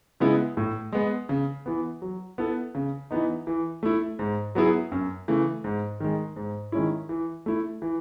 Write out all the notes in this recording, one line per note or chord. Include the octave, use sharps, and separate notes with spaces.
C#3 G#3 B3 E4
A2
G#3 B3
C#3
E3 B3
F#3
B3 E4 A4
C#3
E3 B3 D#4
E3
A3 E4
G#2
F#3 B3 E4 G#4
F#2
C#3 E3 A3
G#2
D#3 G#3
G#2
D#3 G#3 C#4 E4
E3
A3 E4
E3